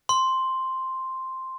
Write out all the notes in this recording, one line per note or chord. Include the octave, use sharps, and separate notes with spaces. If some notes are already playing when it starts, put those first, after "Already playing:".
C6